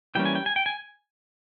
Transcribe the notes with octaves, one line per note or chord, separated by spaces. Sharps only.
E3 G3 A#3 C#4 G5
G#5
G5
G#5
G5
G#5